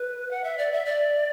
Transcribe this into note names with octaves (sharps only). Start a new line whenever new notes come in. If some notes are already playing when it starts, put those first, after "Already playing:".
Already playing: B4
F#5
E5
D5
E5
D5